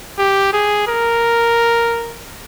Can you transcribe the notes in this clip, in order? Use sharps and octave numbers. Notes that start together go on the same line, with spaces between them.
G4
G#4
A#4